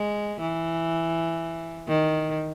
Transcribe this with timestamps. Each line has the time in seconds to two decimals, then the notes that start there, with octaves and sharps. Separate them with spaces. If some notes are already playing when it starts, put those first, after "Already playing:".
Already playing: G#3
0.41 E3
1.88 D#3